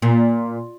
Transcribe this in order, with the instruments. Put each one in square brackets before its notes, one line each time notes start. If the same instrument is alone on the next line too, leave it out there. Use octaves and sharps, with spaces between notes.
[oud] A#2